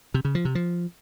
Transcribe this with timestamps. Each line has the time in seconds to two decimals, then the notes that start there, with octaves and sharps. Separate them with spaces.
0.14 C3
0.25 C#3
0.35 F3
0.45 C3
0.55 F3